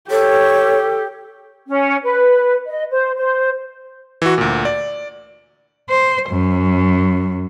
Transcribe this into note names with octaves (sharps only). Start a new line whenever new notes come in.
G4 A4 C#5
C#4
B4
D#5
C5
C5
E3 F#4
D2 A#2
D5
C5
F#2